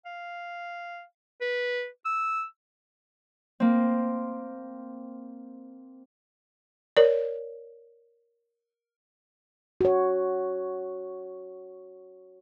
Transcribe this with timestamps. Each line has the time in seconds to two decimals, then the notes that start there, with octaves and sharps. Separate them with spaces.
0.06 F5
1.41 B4
2.05 E6
3.60 A#3 C4
6.97 A#4 C#5 D5
9.81 F#4 C#5